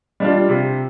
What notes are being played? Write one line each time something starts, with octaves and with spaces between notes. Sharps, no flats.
G3 D4 F4
C3